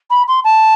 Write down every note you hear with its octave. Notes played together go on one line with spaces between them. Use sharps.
B5
C6
A5